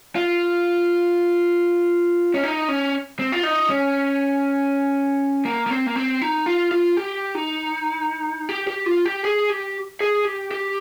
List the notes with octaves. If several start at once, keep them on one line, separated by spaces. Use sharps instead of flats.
F4
C#4
D#4
C#4
C4
F4
D#4
C#4
A#3
A#3
C4
A#3
C4
D#4
F4
F4
G4
D#4
G4
G4
F4
G4
G#4
G4
G#4
G4
G4